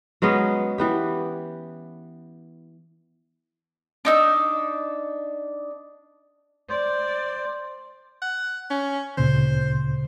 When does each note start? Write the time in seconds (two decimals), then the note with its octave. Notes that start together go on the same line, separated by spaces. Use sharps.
0.22 F#3 G#3 B3 C#4
0.78 E3 B3 G4
4.05 D4 D#4 E6
6.69 C5 D5
8.22 F#5
8.70 C#4
9.17 D2 A#2 C#3 C5